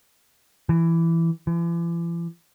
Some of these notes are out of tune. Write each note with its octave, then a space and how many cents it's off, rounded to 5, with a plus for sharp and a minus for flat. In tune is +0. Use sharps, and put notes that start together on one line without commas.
E3 +10
E3 +45